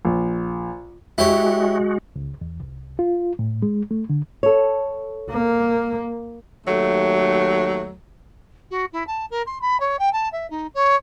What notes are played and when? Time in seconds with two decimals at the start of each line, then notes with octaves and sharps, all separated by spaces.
0.05 A#1
1.18 G#3 E4 F#4 G4 C#5
2.16 C#2
2.41 E2
2.60 C2
2.99 F4
3.39 A2
3.62 G#3
3.91 A3
4.10 D3
4.43 A4 C#5
5.31 A#3
6.67 D#2 F#3 A3
8.71 F#4
8.93 E4
9.07 A5
9.30 A#4
9.47 C6
9.61 B5
9.80 C#5
9.99 G5
10.13 A5
10.32 E5
10.50 D#4
10.74 C#5